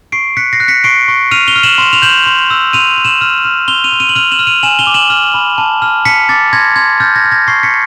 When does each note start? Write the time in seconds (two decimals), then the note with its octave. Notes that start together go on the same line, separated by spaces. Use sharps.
0.12 C#6 C7 D7
0.37 F#6 B6 C#7
0.53 A#6 C7
0.60 F#6
0.68 B6 C#7
0.84 C#6 C7 D7
1.08 C#6
1.31 F6 D#7 F7
1.47 F7 G7
1.56 F6
1.63 E7 F#7
1.78 C6 E7
1.93 F7
2.02 G6 E7 F#7
2.26 C6
2.50 E6
2.73 C6 D#7 F7
2.97 C6
3.05 E7 F#7
3.21 F6
3.45 F6
3.68 C6 F7 G7
3.84 D#7 F7
3.92 C6
4.00 D#7 F7
4.09 F#7
4.15 F6 D#7 F7
4.31 E7 F#7
4.39 F6
4.47 D#7 F7
4.63 G#5 E7 F#7
4.79 F7 G7
4.87 D6
4.94 E7 F#7
5.10 F6
5.34 B5
5.58 A5
5.82 F6
6.05 A5 B6 C#7
6.29 D6 A6 B6
6.53 C6 G#6 A#6
6.76 C6 G#6
7.00 F6 G6 A6
7.16 G#6 A#6
7.24 F6
7.32 G#6 A#6
7.47 C#6 A#6 C7
7.63 B6 C#7